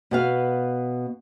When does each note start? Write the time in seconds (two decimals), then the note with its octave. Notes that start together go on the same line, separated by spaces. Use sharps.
0.11 B2 B3 F5